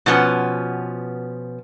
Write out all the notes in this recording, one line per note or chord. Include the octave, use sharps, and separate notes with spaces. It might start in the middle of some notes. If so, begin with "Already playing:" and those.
B2 F3 B3 C#4